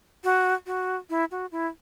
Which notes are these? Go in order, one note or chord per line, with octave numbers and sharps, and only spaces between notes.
F#4
F#4
E4
F#4
E4